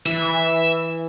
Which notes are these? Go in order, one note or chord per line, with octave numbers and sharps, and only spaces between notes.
E3 E5